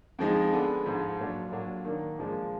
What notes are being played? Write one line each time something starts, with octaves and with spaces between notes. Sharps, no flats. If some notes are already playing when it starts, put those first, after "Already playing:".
F2 F3 G#3 D#4
D3 G#3 B3 D4
G#2 F3 G#3
A#2 F#3 D4
A#2 F#3 D4
D#3 A#3 D4
A#2 F3 G#3 D4